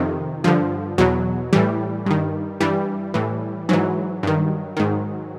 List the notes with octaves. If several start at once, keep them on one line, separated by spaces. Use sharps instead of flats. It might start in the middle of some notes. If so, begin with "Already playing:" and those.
Already playing: F2 C3 D#3
G2 D3 F3
E2 B2 F#3
A2 E3 G3
G2 D#3
G2 E3 G3
A2 E3
G#2 E3 F#3
G2 D#3
G#2 D#3